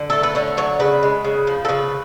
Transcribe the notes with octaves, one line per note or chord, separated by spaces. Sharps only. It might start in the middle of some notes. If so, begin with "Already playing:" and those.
Already playing: D3
A3 A4
B4
D3 C#5
F#3 C#5
C#3 B4
G#3
C#3
F3
A4
C#3 B4